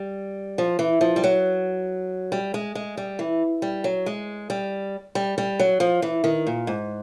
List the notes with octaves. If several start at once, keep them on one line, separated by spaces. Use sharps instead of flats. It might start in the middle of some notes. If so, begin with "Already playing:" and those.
Already playing: G3
F3
E3
F3
G3
F#3
G3
G#3
G#3
G3
E3
G3
F#3
G#3
G3
G3
G3
F#3
F3
E3
D#3
A#2
G#2